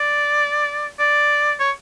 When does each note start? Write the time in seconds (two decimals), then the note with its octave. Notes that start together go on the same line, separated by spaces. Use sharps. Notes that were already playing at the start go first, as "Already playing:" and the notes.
Already playing: D5
0.99 D5
1.60 C#5